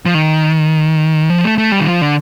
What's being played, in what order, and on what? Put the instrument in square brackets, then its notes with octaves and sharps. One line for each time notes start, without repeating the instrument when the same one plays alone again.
[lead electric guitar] F3
D#3
F3
A3
A3
G3
D#3
F3
D3